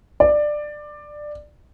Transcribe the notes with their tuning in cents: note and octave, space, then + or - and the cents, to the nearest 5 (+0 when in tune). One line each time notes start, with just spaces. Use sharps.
D5 +15